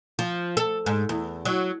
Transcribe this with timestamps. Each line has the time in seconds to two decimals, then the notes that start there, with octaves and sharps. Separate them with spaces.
0.19 F3
0.57 A4
0.86 G#2
1.09 E2
1.45 F#3